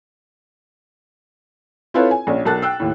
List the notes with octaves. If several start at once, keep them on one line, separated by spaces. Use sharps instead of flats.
C4 E4 F4 A4 B4 C#5
G#5
A#1 C#4
B1 A#4 A5 F#6 A6
G5 E6 F#6 C7
D#2 A2